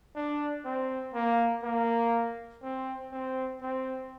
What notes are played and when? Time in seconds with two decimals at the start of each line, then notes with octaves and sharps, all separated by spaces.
0.16 D4
0.65 C4
1.14 A#3
1.63 A#3
2.63 C4
3.12 C4
3.61 C4